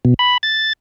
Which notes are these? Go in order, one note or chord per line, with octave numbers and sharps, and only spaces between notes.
B2
B5
A6